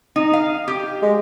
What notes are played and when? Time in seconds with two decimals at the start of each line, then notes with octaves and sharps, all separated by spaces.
0.16 D#4
0.33 F5
0.68 G4
1.02 G#3